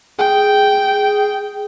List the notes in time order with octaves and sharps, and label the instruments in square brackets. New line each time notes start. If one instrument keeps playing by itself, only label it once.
[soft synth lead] G#4 [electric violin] G5